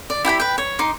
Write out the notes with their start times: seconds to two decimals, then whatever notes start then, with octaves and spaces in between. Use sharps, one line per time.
0.10 D5
0.25 E4 G4 G5 B5
0.40 B4 G5
0.58 C#5
0.79 D#4 C6 D6